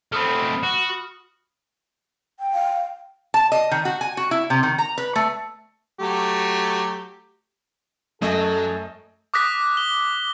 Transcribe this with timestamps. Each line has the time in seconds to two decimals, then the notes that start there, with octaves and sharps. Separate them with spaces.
0.12 A3 C4 B5 D#6 F6
0.63 F#4
2.40 G5
2.53 F5
3.34 A5
3.52 D#5
3.71 D#3
3.85 F#4
4.01 G#5
4.17 F#4
4.31 E4
4.50 C3
4.63 D#3
4.78 A#5
4.98 B4
5.16 A3
6.00 F#3 A3 G4
8.22 F#2 F#3 A3 A4 D#5
9.34 D6 D#6 F#6 A#6 B6
9.77 G7